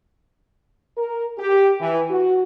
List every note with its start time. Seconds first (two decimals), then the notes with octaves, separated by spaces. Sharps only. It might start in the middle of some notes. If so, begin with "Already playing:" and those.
0.97 A#4
1.38 G4
1.80 E3
2.10 F#4